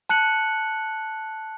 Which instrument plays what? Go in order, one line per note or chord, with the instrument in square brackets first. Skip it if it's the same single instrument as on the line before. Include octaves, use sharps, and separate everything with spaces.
[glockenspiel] A5 F#6 C#7 F#7